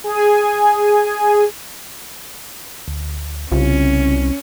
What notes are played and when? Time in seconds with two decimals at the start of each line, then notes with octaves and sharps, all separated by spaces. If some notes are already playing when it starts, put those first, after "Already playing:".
0.04 G#4 G#5
2.88 D2
3.52 C2 C#3 C#4 F4